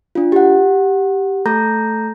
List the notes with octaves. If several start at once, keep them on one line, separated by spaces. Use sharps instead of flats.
D4 F4
G4 F#5
A3 A4 A#5 G6 A#6